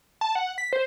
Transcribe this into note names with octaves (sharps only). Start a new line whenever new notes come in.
A5
F#5
B6
C5